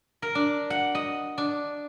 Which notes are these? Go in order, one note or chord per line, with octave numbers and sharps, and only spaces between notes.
A#4
D4
F#5
D#5
D4